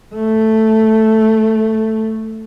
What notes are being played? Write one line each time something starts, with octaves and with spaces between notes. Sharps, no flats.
A3